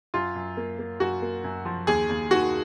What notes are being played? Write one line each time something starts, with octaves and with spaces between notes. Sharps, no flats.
F#2 F4
F#2
A#3
A#3
F#2 F#4
A#3
F#2
F3
D#2 G#4
D#2
D#3 F#4